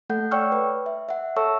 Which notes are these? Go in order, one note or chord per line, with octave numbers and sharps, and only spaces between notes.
A3 A4 F#5 G6
C#5 D5 G5 C#6 E6 F6
B4
E5
E5 F#5
A4 C#5 E5 A5 C#6 E6